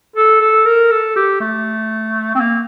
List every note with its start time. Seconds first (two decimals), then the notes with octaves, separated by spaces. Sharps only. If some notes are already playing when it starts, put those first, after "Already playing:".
0.16 A4
0.41 A4
0.66 A#4
0.91 A4
1.16 G4
1.40 A3
2.35 C4
2.40 A#3